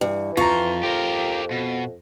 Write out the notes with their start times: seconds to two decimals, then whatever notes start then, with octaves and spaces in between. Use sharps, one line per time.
0.01 G2 E3
0.37 F2 F4 A#5 C#6
0.83 F2 G4 A#4
1.51 B2